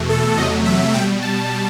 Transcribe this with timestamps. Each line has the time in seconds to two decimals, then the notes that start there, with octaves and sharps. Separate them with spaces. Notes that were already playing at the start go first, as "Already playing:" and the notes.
Already playing: E2 B2 A3
0.09 A4
0.37 E2 C3 F#3 A3 D#5
0.65 E5
0.93 B2 G3 G5
1.22 A5